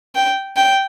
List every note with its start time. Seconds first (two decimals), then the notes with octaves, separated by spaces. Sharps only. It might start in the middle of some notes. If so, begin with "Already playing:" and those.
0.16 G5
0.56 G5